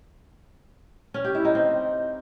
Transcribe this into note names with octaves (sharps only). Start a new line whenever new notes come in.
C#4
G4
E4
D#4
C4